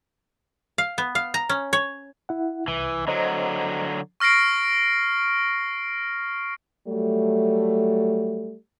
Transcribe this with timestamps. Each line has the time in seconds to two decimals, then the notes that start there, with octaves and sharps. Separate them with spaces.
0.78 F5
0.98 B3
1.15 F5
1.34 A#5
1.49 C#4
1.73 C#5
2.29 E4 F#5
2.68 C2 E3
3.08 D3 F#3 C5 D#5 A#5
4.20 C#6 F6 A#6 C7 D7
6.88 F#3 G3 A3